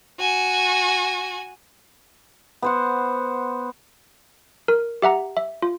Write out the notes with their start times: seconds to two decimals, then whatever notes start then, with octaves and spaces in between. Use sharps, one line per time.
0.19 F#4 G#5
2.62 B3 C5 F#5
4.68 A#4
5.02 G4 E5 F#5 A#5
5.37 E5
5.62 F4